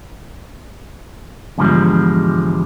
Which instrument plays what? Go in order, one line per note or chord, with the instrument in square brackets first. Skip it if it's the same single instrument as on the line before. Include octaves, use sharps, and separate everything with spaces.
[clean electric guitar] E2 G#2 D3 F3 G3 G#3